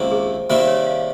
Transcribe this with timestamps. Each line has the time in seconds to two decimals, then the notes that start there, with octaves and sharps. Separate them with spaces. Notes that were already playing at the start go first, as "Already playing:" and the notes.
Already playing: C#2 C3 D#3 A#3 C5
0.11 G#4
0.50 C3 D#3 G3 A#3 C5
0.68 C#5
0.87 F5